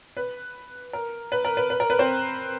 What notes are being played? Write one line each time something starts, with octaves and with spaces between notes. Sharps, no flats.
B4
A#4
B4
A#4
B4
B4
A#4
B4
C4 C5